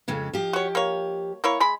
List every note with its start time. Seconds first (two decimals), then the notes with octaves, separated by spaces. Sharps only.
0.08 F2 C#3 G#3
0.34 F3 G4 D#5
0.53 F#4 C#5
0.75 A#3 C#5
1.44 A#3 E4 C#5
1.60 G#3 B5